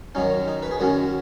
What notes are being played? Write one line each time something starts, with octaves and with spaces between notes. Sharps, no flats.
F#2 D#3 F#3 C#4 D#4
D#4
B4
G#4
F#2 D#3 F#3 C#4 F#4